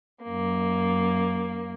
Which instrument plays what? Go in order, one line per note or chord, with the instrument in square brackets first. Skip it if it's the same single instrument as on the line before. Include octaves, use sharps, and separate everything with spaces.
[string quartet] F#2 A#3